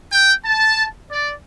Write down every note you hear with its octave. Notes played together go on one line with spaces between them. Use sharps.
G5
A5
D5